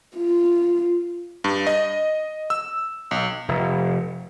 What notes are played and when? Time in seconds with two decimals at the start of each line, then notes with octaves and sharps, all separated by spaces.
0.16 F4
1.44 G2
1.67 D#5
2.50 E6
3.11 B1
3.48 F1